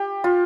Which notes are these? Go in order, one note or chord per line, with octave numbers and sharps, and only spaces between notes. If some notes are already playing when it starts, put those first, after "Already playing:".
Already playing: G4
F4